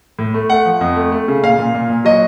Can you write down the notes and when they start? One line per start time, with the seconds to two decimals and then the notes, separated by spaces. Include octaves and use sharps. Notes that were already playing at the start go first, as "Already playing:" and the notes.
0.19 A2
0.34 A3
0.50 A3 F#5
0.66 F3
0.81 F2
0.96 A3
1.12 A3
1.28 C#3
1.43 A#2 F5
1.59 A#2
1.74 A#2
1.90 A#2
2.05 F#3 D#5